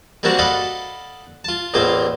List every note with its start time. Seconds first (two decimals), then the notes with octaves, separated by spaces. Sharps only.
0.23 G3 A#3 C4 D4 F#4 A5
0.39 A4 D5 D#5 F5 F#5 B5
1.44 F4 A5
1.74 A1 E2 A#3 F4 C5